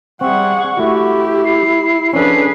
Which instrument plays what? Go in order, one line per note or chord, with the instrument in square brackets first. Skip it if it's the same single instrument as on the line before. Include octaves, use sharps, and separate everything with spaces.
[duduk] G3 [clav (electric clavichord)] C4 E5 [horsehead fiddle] G#4 F#5 [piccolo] C#6
[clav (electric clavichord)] A3 F#4 [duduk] E4 [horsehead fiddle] G4
[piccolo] C7
[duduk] F3 [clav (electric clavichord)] C#4 D4 A4 [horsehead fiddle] G#4 B4 [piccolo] C7